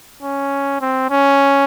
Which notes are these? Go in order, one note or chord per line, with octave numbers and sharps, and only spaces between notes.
C#4
C4
C#4